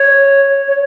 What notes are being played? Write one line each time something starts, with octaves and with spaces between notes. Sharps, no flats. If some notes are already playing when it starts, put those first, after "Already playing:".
Already playing: C#5
C#5